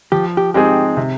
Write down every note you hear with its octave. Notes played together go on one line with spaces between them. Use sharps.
F3 G4
G4
G#3 C4 D#4 G4 G#4
C3